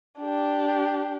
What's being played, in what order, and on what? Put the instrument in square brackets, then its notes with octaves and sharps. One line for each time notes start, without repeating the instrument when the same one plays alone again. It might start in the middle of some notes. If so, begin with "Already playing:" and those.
[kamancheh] D4 G4